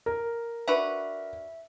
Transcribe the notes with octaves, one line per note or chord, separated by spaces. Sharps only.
A#4
D4 F#4 B4 E5